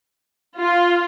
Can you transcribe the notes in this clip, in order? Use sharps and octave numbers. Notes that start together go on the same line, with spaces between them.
F4